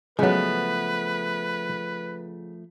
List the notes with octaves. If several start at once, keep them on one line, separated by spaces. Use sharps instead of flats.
C#3 F3 F#3 G#3 A3 B3 B4